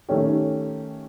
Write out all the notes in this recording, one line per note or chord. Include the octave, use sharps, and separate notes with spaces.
D#3 A3 C#4 G4